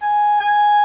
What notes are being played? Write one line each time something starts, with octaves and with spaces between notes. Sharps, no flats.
G#5
G#5